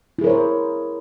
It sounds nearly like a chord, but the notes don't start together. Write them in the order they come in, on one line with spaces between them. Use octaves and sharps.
E4 G#4 A#4 C#5 C5